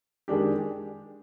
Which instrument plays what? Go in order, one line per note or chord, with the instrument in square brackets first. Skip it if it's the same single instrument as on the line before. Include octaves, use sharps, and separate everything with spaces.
[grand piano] D#3 G#3 D4 G4